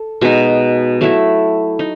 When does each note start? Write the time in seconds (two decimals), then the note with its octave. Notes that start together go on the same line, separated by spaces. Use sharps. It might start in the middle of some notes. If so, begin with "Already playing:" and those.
Already playing: A4
0.21 B2 G#3 D#4
1.01 F#3 A3 E4
1.79 D#4